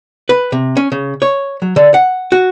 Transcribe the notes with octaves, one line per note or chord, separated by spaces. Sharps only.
B4
C3
C#4
C#3
C#5
F#3
D3
F#5
F#4